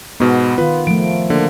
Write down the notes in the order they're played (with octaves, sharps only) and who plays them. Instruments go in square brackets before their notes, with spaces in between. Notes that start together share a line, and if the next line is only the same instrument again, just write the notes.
[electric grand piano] G#2 B2 [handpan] B3
[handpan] D#3 F4 [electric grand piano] B4
[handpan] F3 A3 [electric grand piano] D7
[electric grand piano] D3 [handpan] A#3